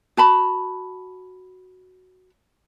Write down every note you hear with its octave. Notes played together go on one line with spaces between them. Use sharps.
F#4 A5 B5